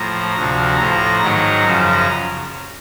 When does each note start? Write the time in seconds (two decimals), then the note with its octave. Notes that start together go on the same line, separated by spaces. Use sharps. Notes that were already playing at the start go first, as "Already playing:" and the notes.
Already playing: A2 F3 A#5
0.35 D2 C3 F3 A#5
0.78 A2 F3 A#5
1.21 G#2 D#3 F#3 A#5
1.63 F#2 C#3 F3 A#5